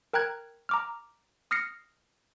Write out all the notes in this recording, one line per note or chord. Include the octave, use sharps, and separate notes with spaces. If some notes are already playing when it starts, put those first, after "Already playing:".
A#4 G5 A#5 F#6 G#6
A#5 D6 F6
D#6 F6 A#6 C7 C#7